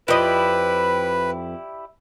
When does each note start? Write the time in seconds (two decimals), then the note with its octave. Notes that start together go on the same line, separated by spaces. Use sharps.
0.08 F2 E4 G4 B4 D5 D#5